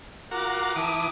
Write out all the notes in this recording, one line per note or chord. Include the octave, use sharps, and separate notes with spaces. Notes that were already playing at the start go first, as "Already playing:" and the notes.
F4 F#4 A#4 D6
E3 G5 A5 A#5 D6 D#6